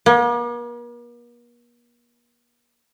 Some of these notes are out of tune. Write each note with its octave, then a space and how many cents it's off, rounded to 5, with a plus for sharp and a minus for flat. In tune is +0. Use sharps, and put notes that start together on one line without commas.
A#3 +45